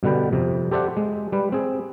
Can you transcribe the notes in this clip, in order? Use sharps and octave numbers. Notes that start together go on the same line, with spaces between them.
G2 B2 D3 B4 G5
F2 C3
G4 A4 C5 D5 E5 F#5
G#3
G3 B4
C4 G#4